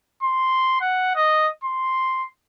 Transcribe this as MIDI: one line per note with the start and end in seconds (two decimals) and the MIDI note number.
0.23 0.81 84
0.81 1.11 78
1.16 1.49 75
1.64 2.27 84